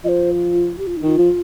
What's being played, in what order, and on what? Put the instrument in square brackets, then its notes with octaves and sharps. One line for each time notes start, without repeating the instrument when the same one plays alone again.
[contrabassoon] F3 [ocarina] C5 D#5
[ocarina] F4
G4
F4
D#4
[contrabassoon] D#3 [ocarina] F4
[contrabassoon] F3